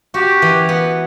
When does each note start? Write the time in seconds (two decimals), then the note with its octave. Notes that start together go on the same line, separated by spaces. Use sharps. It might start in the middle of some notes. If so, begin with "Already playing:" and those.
0.14 F#4 G4
0.42 E3
0.69 B3